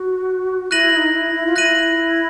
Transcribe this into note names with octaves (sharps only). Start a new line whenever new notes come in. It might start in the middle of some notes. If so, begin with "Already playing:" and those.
Already playing: F#4
E4 F#6 A#6 D#7 F#7
E4
D#4
E4
E4
F4
E4 F#6 A#6 D#7 F#7